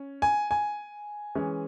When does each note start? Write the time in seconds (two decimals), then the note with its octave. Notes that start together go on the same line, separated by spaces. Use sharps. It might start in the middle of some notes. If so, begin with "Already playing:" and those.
Already playing: C#4
0.22 G#5
0.51 G#5
1.35 E3 G#3 C#4